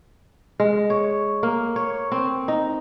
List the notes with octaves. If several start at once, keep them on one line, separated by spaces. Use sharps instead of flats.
G#3
C#5
A#3
C#5
C4
D#4